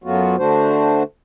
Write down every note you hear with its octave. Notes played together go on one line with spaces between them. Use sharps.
F#2 F#3 A3 B3 F4 F#4
D3 A3 D4 F#4 C5